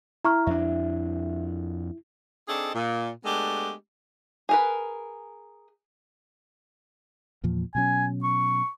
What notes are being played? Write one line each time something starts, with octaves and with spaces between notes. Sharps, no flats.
E4 A#5 C#6 F6
F2 D4 E5
C4 D4 D#4 G#4 A4
A#2
G#3 A3 B3 D4 G4
G#4 A#4 B4
E2 A#2 F3
B2 F#3 C#4 G#5
C#6